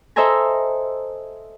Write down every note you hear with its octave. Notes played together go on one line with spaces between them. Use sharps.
A4 C5 D#5 E5 G#5 A#5